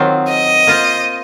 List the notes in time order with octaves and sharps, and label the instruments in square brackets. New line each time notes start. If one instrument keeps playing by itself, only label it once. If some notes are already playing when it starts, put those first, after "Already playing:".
Already playing: [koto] D#3 F#3 C4 F4
[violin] D#5
[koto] A#3 F4 C5